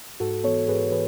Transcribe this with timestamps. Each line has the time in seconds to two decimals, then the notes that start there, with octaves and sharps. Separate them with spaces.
0.20 G#2 F#4 A4
0.44 E3 B3 A4 C#5
0.68 G#2 G#4 B4
0.92 E3 G#4 B4